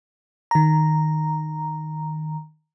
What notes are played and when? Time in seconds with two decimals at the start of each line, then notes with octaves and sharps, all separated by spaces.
0.51 D#3 A#5